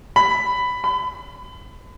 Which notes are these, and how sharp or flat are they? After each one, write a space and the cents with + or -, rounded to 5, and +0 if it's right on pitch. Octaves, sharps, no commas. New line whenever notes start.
B5 +10
B5 +35